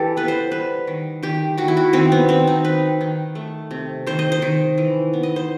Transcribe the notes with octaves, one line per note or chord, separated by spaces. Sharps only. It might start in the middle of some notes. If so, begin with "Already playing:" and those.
Already playing: E3 G4 A4
B3 B4
C5
G3 B4
D#3
D#3 G4
D#3 F#4
E4
F#4
D#3 C4
B3
D#3 C4
D#4
D#3 B4
D#3
A3
C3
D#3 C5
D#5
C5
D#3
E3
B3
D#5
C5